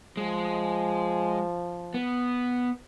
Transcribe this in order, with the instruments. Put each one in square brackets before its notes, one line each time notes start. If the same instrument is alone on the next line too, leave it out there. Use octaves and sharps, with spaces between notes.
[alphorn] F3 [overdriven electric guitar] G#3
[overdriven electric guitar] B3